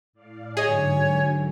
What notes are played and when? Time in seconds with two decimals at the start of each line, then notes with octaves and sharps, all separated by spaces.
0.13 A2 D5 F5
0.57 G#2 D3 F#3 G#4 C#5 D#5 G#5